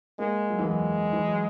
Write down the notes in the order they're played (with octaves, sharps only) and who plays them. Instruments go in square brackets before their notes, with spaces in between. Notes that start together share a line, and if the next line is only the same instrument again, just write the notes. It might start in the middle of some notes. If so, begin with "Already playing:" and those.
[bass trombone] G#3 [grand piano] A#3
[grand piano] F#3
E3
[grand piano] F#3 [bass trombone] G#3
[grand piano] E3
F#3